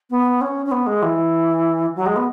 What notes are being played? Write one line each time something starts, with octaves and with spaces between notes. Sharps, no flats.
B3
C#4
C#4
B3
G#3
E3
F#3
G#3
B3